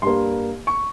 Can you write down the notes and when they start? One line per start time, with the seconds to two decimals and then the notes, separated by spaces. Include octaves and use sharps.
0.02 G2 G3 A#3 C6
0.67 C#6